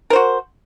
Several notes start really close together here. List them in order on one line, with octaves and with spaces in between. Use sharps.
A#4 C5 F#4